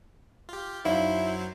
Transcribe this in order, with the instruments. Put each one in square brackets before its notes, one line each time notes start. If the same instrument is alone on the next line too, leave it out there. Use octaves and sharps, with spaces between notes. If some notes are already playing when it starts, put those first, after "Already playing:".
[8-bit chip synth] F4 G4
[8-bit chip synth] F#2 F#3 C5 [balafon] D#4 D5 F5 [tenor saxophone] E4